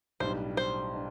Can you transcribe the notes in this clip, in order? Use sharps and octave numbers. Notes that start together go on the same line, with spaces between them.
B1 A2 G3 D4 C5
C5
D4